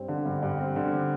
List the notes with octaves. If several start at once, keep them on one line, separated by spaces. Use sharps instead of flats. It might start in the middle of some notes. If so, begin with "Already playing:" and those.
Already playing: G2 C4
D3
G2
G2
C4
D3